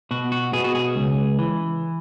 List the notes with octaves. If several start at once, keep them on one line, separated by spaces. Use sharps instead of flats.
B2 F#4
F#4
B2 G#4
F#4
G#4
C#2
E3